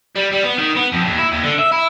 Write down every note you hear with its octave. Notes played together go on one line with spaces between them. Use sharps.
G3
G3
B3
D#3
B3
F2
D#2
E4
D#2
D3
E5
E4